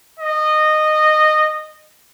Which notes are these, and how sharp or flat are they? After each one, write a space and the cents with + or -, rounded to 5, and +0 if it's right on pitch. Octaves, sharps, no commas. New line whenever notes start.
D#5 -15